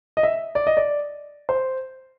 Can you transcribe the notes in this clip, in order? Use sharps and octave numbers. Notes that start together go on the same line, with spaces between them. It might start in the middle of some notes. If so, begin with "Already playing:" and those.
D#5
E5
D5
D#5
D5
C5